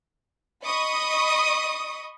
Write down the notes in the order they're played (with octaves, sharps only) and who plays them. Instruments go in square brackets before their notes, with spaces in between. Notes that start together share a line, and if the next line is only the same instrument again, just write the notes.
[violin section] D#5 B5 C#6 D#6